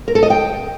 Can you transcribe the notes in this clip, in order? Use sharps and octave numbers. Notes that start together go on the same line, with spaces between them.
A#4
A4
D#5
G5